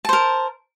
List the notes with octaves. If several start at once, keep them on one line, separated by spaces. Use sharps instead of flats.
A#4 C5 A5